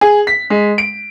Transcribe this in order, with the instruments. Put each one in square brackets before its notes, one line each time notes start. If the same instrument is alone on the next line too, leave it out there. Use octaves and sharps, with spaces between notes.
[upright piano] G#4
B6
G#3
D7